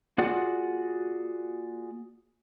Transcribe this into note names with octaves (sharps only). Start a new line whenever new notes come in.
A#3 F4 F#4 G#4 D5 F#5